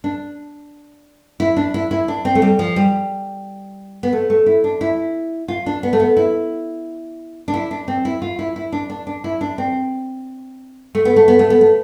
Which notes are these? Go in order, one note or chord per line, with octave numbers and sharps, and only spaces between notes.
D4
E4
D4
E4
E4
D4
C4
A3
G3
F3
G3
B3
A3
A3
E4
D4
E4
F4
D4
B3
A3
B3
E4
D4
E4
D4
C4
E4
F4
E4
E4
D4
D4
D4
E4
D4
C4
A3
B3
A3
B3
A3
B3
A3